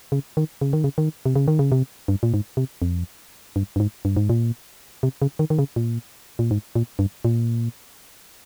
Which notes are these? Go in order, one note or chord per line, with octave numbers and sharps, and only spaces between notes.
C#3
D#3
C#3
D#3
C#3
D#3
C3
C#3
D#3
C#3
C3
G2
A#2
G#2
C3
F2
G2
G2
G#2
G2
G#2
A#2
C3
C#3
D#3
D#3
C#3
A#2
A#2
G#2
A#2
G2
A#2